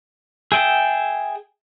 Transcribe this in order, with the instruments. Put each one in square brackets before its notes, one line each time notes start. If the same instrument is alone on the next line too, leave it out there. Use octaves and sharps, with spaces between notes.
[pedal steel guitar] G#4 E5 G5 A5